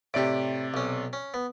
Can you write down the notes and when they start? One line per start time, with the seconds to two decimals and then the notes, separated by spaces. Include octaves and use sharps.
0.14 A2 C3 G4 D5 D7
0.74 B1 C#4
1.13 C#4
1.34 B3